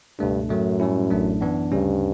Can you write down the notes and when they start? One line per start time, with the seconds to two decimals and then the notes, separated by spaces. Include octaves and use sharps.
0.19 C#2 G2 B2 A3 D4
0.49 F#2 A2 F#3 A3 C#4
0.80 A2 G3 C#4 E4
1.10 A1 A2 F#3 A3 D4
1.41 F#2 E3 B3 D4
1.72 D2 G2 C#3 G3 C#4